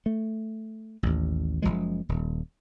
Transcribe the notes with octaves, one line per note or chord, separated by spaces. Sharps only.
A3
A1 D#2
F#1 C#2 F3 G#3
D#1